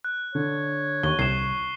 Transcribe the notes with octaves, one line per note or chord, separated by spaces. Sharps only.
F#6
D3 C#5
D#2 C#6 G7
C2 C7 E7